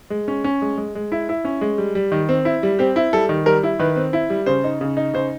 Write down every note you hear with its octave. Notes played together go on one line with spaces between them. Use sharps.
G#3
C#4
C#4
G#3
G#3
G#3
E4
E4
C#4
G#3
G3
G3
D#3
C4
E4
G3
C4 G4
E4
G3 A4
D#3
G3 A#4
E4
D#3 B4
C4
E4
G3
C#3 C5
D#4
C#3
D#4
C#3 C5